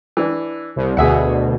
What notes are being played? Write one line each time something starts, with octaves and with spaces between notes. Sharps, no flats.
E3 D4
C2
D2 B2 G#4 E5 F#5